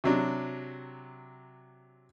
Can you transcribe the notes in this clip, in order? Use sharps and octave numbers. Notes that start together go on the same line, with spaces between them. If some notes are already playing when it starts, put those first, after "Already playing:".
C3 F#3 D4